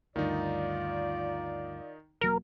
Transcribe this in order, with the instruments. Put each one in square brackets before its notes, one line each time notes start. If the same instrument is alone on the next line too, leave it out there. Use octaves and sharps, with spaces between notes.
[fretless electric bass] D2 G2 [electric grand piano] D#3 D#4 [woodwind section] F4 D5
[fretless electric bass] E1 F#3 A#3 [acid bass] A#4